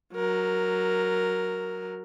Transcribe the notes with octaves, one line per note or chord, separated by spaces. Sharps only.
F#3 A#4